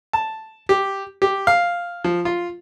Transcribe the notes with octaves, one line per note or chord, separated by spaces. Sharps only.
A5
G4
G4
F5
F3
F4